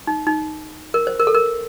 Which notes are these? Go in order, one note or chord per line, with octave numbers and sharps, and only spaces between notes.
D#4
D#4
A#4
C5
A#4
A4
A#4